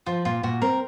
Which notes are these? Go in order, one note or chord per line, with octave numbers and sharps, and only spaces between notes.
F3 F4
A#2 F4
A#2 F#4
C4 A#4